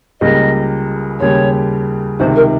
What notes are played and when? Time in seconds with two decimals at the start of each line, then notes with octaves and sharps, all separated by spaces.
0.20 C#2 C#3 G3 A#3 D#5
1.20 D#2 C#3 G3 C#5
2.19 C#2 C3 D#3 C5
2.36 A#4